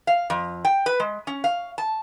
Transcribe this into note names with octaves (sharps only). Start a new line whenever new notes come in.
F5
F2
G5
B4
G#3
C#4
F5
A5